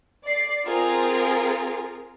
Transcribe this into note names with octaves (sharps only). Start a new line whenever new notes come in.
D5 C7
C4 F4 G#4 A#4